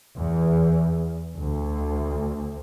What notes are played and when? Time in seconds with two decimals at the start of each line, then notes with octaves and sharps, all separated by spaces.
0.16 E2
1.37 D2